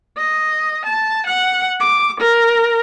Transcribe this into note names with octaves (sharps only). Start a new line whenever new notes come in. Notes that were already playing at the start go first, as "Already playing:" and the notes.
D#5
A5
F#5
D6
A#4